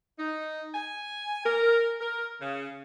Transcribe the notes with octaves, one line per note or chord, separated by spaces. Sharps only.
D#4
G#5
A#4
A#4
C#3